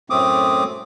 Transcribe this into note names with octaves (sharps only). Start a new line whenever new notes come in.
F#2 A2 A3 C4 D6 D#6